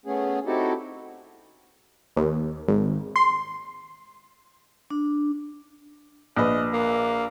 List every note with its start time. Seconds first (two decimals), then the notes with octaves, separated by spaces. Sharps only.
0.06 A3 B3 C#4 G#4
0.46 C4 D#4 E4 F#4 G4 A4
2.17 D#2
2.68 G#1
3.16 C6
4.90 D4
6.37 A#1 B4 D#5
6.73 A#3